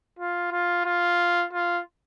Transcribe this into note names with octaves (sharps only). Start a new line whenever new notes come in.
F4
F4
F4
F4